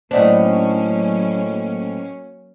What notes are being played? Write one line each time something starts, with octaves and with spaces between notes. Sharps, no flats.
A2 F#3 A#3 B3 C#4 D4 C5 D#5